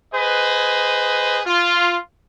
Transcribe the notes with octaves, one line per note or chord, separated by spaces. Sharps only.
G#4 B4 C5 D#5
F4